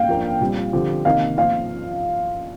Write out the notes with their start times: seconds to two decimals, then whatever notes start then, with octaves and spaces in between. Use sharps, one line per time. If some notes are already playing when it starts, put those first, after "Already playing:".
Already playing: F5 G5
0.08 F3 A#3 D4
0.41 A#2 G3 C4
0.73 D3 F3 C4 G4
1.05 C3 D#3 A#3 D#4 F5
1.37 F3 C4 F4 F5